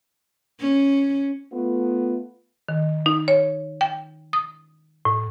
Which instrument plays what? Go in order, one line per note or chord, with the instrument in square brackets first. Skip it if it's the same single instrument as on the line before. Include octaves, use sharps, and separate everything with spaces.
[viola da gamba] C#4
[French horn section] A3 B3 F4
[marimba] D#3
D#4
C#5
G5
D#6
A2